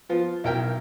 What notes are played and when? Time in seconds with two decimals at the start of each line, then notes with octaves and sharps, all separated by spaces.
0.09 F3 B3 F4
0.44 B1 E4 A#4 G5 F6